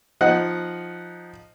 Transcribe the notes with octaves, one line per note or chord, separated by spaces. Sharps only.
F3 D#4 F#5